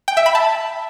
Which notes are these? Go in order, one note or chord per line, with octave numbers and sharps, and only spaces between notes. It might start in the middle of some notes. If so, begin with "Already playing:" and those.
G5
E5
B5
A5